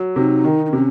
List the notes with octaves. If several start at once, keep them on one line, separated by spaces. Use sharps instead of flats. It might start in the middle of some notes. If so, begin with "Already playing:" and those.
Already playing: F#3
C3 D#4
D#3
D#4
C3 C#4